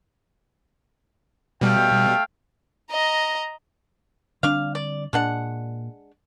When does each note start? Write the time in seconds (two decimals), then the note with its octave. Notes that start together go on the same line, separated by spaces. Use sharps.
1.61 B2 G3 A3 F5 G5
2.90 D#5 A#5
4.43 D3 G3 C4 D4 F5
4.75 D5
5.13 A#2 G#3 D4 F#5